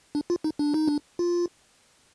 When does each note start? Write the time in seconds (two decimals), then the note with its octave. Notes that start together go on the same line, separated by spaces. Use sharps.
0.15 D4
0.30 F4
0.44 D#4
0.59 D4
0.74 D#4
0.88 D4
1.19 F4